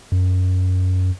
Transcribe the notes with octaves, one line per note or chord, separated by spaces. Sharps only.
F#2